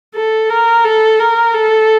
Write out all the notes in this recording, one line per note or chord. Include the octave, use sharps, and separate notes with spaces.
A4
A#4
A4
A#4
A4